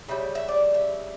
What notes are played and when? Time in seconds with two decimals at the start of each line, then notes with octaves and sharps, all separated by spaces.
0.08 C#3 G3 E5
0.35 E5
0.48 D5
0.74 E5